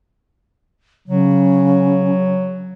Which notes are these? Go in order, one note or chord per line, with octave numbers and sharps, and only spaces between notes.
C#3 F#3